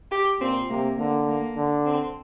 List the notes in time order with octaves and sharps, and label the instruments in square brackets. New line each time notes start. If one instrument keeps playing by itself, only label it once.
[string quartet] G4
[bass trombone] A#2 [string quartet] C4
[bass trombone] C3 [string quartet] A#3
[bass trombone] D3 [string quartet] A#3
[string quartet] A#3
[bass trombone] D3
[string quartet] C4